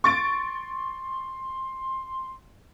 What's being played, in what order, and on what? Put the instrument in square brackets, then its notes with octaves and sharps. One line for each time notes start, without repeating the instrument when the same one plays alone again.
[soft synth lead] C6 [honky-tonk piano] C#6 A6 D7